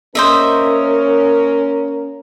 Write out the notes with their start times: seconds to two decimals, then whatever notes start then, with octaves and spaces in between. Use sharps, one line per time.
0.15 A#3 C#4 A#4 C5 D#5 E5